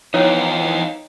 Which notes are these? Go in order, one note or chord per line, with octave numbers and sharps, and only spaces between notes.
E3 F3 B3 D#4 C#5 D#5 F5 G5